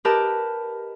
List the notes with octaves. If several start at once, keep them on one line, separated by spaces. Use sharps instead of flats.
G4 A#4 B4 D#5 A5